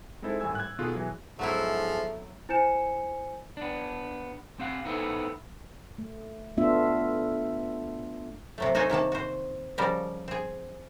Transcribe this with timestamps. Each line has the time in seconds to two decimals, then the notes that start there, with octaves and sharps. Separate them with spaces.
0.22 G#3 C4 D#4 E4 A4 C5
0.40 G#1 A2 G3 G#5 E6 G#6
0.55 F#6 G#6
0.78 B2 D#3 B3 F4 G#4 A4
0.94 B2 E3 F#3 G#4
1.39 G#2 F3 F#3 A3 B3 E4
2.49 E4 C5 G#5 G6 C#7 E7
3.57 B3 D4
4.59 C4 G4 F5 F#5
4.85 B3 D#4 E4 A4 C5
5.98 A3
6.57 A3 B3 D4 F4 E5
8.58 C3 F#3 A3
8.75 D#4 F#4 A4 C5 C#5 G#5
8.90 C3 D#3 A#3 A5
9.12 F#4 C5
9.78 C#3 F3 G3 F#4 A#4
10.28 C4 G#4